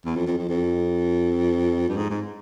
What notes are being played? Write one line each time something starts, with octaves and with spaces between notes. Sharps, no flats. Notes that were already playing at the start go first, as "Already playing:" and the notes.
E2
F2
F2
F2
F2
G2
G#2
G#2